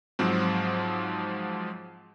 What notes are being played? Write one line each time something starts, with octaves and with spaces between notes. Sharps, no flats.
G#2 F3 F#3 C4